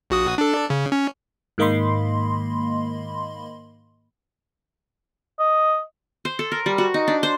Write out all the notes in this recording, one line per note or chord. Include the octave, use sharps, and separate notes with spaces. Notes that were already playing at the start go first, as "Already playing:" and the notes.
A#1 F#4 D#6
D4 A4
C#3
C#4
G#2 D#3 A#3 D#5 B5 C6
D#5
C5
A4
A#4
G3
F#4
D#4
D4
C5